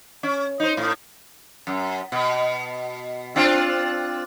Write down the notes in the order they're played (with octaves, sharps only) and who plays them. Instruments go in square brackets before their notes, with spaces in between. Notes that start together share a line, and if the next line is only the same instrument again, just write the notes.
[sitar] C#4
D#4 C5
A2
F#2
B2
C4 D4 F4